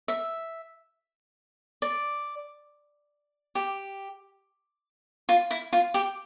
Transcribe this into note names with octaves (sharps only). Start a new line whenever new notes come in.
E5
D5
G4
F4
E4
F4
G4